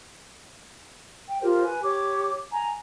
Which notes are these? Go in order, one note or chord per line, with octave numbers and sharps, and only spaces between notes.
G5
F4 G4 A#4 C5
B4 G#5
G4 C#5 D6
G#5 A#5